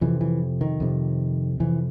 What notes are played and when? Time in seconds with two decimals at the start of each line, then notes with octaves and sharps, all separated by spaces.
0.01 F2 C3 E3
0.21 E3
0.61 D#3
0.80 F2 C3
1.60 F2 C3 E3